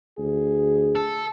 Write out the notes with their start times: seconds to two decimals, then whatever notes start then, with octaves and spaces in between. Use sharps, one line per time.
0.18 D2 G#4
0.95 A4